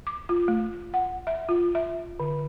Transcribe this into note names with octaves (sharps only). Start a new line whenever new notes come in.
D6
F4
A3
F#5
E5
F4
E5
D3